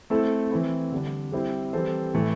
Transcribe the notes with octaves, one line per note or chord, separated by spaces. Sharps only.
A3 C4 E4 A4
E3 C4 E4
D3 G3 D4
G3 C4 E4 C5
E3 G3 C4 A4 C5
A2 E3 A3